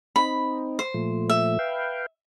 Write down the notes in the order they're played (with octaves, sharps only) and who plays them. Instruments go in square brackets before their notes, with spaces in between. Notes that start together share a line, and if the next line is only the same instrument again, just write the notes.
[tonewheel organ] C4 D#4 [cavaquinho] B5
[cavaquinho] C5
[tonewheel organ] A#2 F3 A3
[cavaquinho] E5
[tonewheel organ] B4 F5 G5